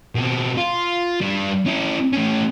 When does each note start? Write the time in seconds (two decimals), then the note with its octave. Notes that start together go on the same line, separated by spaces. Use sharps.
0.15 B2 C4
0.57 F4
1.21 G3 D4
1.66 C#4 E4
2.13 A2 C#4